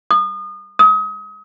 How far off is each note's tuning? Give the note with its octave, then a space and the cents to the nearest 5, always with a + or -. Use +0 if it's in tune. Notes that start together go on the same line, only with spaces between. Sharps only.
D#6 -35
D#6 +35